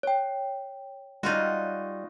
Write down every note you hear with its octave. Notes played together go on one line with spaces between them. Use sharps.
C#5 G5
G3 D#4 F4 F#4